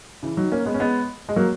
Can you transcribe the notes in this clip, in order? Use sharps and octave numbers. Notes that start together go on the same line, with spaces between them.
C#3 E3
D#3 F#3
A#3 C#4
G#3 B3
C#4
G#3 B3
G#3
F#3 A#3